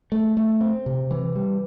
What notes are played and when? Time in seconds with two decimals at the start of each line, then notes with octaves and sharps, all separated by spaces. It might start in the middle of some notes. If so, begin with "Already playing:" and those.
0.12 A3
0.37 A3
0.61 C4
0.86 C3
1.11 E3
1.35 G3